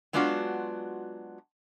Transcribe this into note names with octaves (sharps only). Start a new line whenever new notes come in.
F#3 G#3 B3 D4 F4 F#4